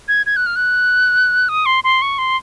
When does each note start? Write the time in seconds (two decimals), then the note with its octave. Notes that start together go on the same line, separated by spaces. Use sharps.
0.08 G#6
0.26 G#6
0.36 F#6
0.46 F6
0.56 F#6
1.49 D#6
1.66 C6
1.84 C6
2.02 C#6
2.18 C6